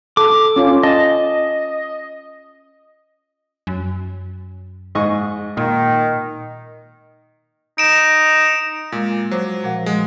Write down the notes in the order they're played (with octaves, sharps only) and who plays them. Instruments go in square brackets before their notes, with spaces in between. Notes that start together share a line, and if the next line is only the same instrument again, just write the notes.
[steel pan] A4 [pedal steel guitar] D6
[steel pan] C#4 F4
[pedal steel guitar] D#5 [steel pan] A5
[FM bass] F#2
[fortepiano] G#2 D#5 C#6
[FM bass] A#2 [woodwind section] D#3
[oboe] D#4 [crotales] D7 E7
[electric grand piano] A#2 [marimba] G#3
[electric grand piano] F#3 [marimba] C5 D6
[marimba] A#2 F3 F#5
[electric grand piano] G#3